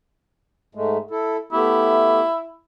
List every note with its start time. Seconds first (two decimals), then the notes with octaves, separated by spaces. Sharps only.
0.75 G#2 G#3 A3
1.11 E4 A4
1.53 A3 B3 E4 G4